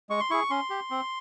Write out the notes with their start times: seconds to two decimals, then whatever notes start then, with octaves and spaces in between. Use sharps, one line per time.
0.10 G#3 C#6
0.20 C6
0.30 E4 G#4 C#6
0.50 C#4 C6
0.70 G4
0.91 C4